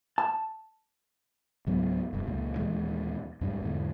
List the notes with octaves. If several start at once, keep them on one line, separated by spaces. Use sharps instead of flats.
A5
C#2 G#2 F#3 B3
F1 G2
C#2 A#2
D#2 A#2 E3 G#3
F2 G#2 G3
E2 G#2 D3